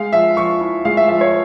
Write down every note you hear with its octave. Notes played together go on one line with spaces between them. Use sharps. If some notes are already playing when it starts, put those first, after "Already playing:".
Already playing: G#3 F5
F3 E5
F3 C#6
E4
G#3 F5
E5
F3 E5
C#5